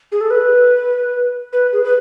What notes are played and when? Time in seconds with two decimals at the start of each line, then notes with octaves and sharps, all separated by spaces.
0.12 G#4
0.21 A4
0.30 B4
1.53 B4
1.73 G#4
1.84 B4